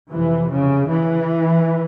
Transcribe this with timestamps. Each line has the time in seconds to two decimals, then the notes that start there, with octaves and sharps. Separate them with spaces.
0.11 F2 C3 E3
0.51 C#3
0.89 E3